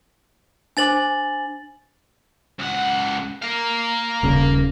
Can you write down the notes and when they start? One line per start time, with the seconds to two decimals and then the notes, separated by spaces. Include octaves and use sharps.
0.77 D4 C5 G#5 D6 A6 F#7
2.59 C#2 F#5
3.42 A#4 F5
4.23 D#1 C#3